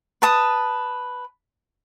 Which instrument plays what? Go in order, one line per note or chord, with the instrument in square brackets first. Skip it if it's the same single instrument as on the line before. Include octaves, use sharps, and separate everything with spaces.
[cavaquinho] B4 A5 D#6